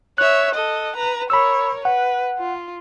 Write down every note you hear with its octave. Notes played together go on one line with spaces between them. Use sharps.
C#5 E5 F#6
A4 D#5
B4 A#5
A#4 C#5 B5 E6
B4 F#5
F4